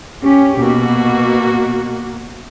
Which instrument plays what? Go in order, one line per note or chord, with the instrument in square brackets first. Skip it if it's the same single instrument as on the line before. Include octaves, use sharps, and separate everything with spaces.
[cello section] C#4 G4
[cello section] B2 [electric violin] A#3 F#4